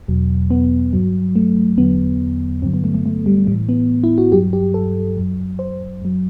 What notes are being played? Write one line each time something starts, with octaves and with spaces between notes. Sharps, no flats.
E2 B2 F#3
B3
G2 F#3
A3
E2 D3 F#3 B3
G2 D3 F#3 C4
B3
A3
A3
A3
G3
A2 E3 G3
B3
E4
F#4
G2 F#3 G4
G4
A4
F#2 F#3
C5
F#2 F#3